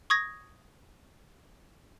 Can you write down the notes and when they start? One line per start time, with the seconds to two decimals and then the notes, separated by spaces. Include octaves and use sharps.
0.10 C#6 D#6 G#6 A#6